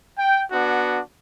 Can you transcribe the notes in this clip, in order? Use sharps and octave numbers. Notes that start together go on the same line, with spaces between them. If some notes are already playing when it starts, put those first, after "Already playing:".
G5
B3 D4 F#4